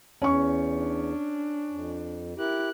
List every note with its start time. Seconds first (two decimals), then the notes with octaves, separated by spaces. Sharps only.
0.22 E2 C#4 C#6
0.76 D4
1.70 F2
2.37 E4 G4 A#4 F#6